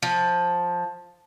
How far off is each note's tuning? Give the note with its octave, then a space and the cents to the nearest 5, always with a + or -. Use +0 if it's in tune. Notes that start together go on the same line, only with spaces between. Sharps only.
F3 +10